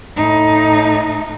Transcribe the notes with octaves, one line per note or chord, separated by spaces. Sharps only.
A2 D#4